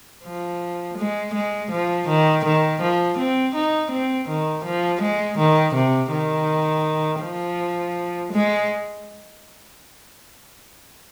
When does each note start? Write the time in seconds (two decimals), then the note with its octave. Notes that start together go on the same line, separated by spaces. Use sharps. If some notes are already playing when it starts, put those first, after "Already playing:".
0.25 F3
0.97 G#3
1.34 G#3
1.71 F3
2.08 D#3
2.45 D#3
2.81 F3
3.18 C4
3.55 D#4
3.91 C4
4.28 D#3
4.64 F3
5.01 G#3
5.38 D#3
5.75 C3
6.11 D#3
7.22 F3
8.32 G#3